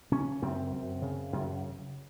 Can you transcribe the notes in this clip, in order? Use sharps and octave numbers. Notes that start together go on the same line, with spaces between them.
C#3 C#4
F#2 C4
F#2
C#3
F#2